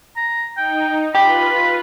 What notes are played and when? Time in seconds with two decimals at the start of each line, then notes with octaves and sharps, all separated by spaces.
0.16 A#5
0.57 D#4 G5
1.15 F4 G4 B4 B5